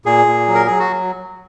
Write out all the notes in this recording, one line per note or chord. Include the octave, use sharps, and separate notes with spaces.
A#2 G#4
A#2
F#3
A#4
F#3 G#4
F#4